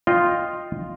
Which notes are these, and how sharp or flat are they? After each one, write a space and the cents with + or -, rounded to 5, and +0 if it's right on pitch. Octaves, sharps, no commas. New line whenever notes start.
F4 +0 D#5 +0 G5 +0